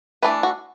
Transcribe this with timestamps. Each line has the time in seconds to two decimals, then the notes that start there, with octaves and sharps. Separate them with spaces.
0.23 E3 A3 D4 B4
0.43 F#4